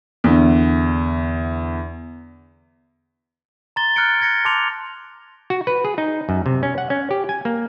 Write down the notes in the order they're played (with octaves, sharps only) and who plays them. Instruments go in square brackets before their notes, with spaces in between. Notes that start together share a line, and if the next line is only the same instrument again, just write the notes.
[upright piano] E2 D3
[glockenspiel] A#5 C6 A6 G7
F6 F#6 G#6 A6 C#7 D7
F#6 G#6 A#6 C#7
A5 C6 D6 G6 C#7 F7
[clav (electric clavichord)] F#4
B4
G#4
D#4
F#2
C3
C#4
F#5
C#4
G4
G#5
A#3